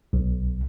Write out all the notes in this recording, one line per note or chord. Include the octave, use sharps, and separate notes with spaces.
B1